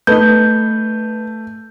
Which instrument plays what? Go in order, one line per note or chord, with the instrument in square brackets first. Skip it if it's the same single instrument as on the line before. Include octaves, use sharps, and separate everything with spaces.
[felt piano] A3 [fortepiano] B3 D#4 [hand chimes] G6